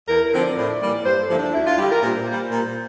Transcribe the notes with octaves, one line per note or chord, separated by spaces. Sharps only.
E2 A#4
A#4
D3 F3 C4
D5
A2
E3 G3 A#3
G2 C5
A4
D3 F3 A#3 E4
D4
D2 E4
F4
D3 G3 G4
A#4
A#2 C5
G3 A#3
A#2